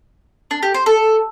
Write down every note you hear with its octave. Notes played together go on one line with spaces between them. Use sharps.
D4
G4
C5
A4